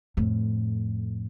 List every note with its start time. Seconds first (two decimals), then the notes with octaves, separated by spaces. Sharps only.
0.17 F2 A2